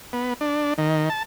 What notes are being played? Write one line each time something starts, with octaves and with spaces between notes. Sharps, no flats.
B3
D4
D#3
A5